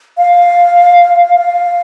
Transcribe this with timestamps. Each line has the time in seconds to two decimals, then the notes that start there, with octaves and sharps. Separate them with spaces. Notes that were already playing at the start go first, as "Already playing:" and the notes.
0.18 F5
1.36 F5